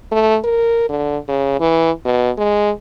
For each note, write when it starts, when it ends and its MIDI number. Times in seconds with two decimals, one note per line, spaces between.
0.11 0.38 57
0.44 0.88 70
0.89 1.17 50
1.28 1.56 49
1.60 1.91 52
2.05 2.31 47
2.38 2.71 56